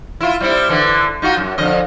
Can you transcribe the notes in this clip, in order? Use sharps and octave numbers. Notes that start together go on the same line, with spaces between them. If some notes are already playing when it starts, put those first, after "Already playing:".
E4 F4
G3 C4 E4
D3 E3
D#4 F4 F#4
F#2
F2 D3 D#5